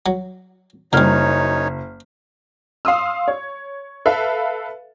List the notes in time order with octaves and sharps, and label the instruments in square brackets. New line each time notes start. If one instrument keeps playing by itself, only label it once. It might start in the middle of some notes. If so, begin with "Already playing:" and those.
[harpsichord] F#3
[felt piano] F#1 F6 [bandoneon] F#2 D#4 C#5 [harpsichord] D3 G3
[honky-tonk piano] F5 C6 D#6 E6
C#5
A4 B4 E5 F5